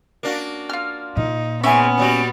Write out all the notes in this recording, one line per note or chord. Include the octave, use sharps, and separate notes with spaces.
A#3 D4 F#4
F4 F6
A#2 D#4
G#2 C#3 B3 C#4 E5 G#5
F#3 G3 F#4